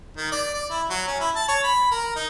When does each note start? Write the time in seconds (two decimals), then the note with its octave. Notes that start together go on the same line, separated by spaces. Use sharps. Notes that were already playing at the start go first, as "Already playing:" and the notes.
0.17 D#3
0.32 D5
0.55 D5
0.70 E4
0.90 F#3
1.08 C#4
1.20 E4
1.36 A5
1.48 C#5
1.64 B5
1.92 A#4
2.16 D#4